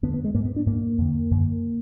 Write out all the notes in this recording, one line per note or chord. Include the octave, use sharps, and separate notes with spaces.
F2 D3 B3
B3
G#3
G#2 A#3
B3
D4
G#2 A#3
F2 D3
F#2 D3